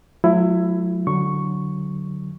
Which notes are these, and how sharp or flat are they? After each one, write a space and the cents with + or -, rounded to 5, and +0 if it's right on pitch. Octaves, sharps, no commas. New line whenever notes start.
F#3 -35 A3 -45 E4 +15
D3 +0 F#3 +0 C#6 +0